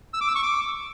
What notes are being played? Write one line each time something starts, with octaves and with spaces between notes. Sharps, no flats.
E6
D6
E6
C#6
D6